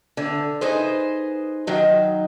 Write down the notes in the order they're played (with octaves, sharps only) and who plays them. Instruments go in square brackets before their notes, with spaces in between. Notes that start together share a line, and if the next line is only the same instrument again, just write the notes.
[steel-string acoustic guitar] D3
D#4 G#4 B4 C5
D#3 F#3 D#4